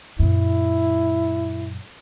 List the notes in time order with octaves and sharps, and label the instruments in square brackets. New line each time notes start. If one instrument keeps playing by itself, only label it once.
[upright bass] F#2 A#2 [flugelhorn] E4